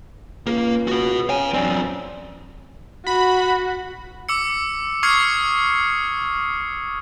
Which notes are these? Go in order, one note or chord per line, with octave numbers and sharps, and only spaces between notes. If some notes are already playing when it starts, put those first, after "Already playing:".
C#2 A#3
F#4 B4
C#4 F5 G#5
F#2 C4 D4
F#4 B5
D6 E6 C#7
C#6 D#6 F6 G#6 C7 C#7